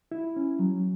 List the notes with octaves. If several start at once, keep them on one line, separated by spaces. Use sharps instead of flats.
E4
C#4
F#3